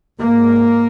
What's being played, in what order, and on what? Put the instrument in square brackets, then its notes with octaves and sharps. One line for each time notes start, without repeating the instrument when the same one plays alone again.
[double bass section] G#2 A#3